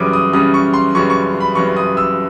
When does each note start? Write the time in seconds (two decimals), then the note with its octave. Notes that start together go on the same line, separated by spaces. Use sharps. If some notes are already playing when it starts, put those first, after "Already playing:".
Already playing: F#2 C#3 E3 G3 D6 D#6
0.13 D#6
0.33 F#2 C#3 E3 G3 D#6
0.54 C#6
0.74 C6
0.95 F#2 C#3 E3 G3 C#6
1.10 C#6
1.40 B5
1.55 F#2 C#3 E3 G3 C#6
1.77 D#6
1.97 E6